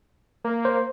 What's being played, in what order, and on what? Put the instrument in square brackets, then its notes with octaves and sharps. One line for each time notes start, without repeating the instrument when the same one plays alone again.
[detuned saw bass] A#3
[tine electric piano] C5